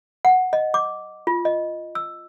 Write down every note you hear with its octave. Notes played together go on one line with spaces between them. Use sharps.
F#5
D#5
D6
F4
D#5
E6